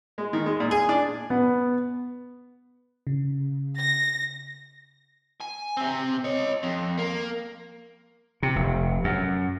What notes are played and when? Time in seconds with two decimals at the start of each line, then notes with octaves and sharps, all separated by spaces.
0.18 G#3
0.33 D#3
0.46 G#3
0.60 A#2
0.71 G#4
0.89 D4
1.30 B3
3.07 C#3
3.77 A#6
5.40 G#5
5.77 C3 C4
6.24 C#5 D#5
6.63 F2
6.99 A#3
8.43 C3
8.56 F1
9.04 F#2